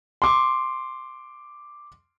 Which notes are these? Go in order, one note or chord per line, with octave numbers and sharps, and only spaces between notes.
C6 D6